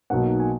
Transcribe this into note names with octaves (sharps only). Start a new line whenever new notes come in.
B1 B2 F#3 A#3 D#4 F#5
G#5